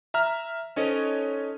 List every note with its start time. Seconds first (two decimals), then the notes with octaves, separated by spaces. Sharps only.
0.14 E5 A#5 F6
0.76 C#4 D#4 A4 C5 C#5 D#5